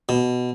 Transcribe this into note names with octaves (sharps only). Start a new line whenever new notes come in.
B2